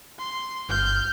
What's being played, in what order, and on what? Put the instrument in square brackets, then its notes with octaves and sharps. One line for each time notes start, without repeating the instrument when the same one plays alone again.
[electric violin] C6
[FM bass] G1 [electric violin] F6 G6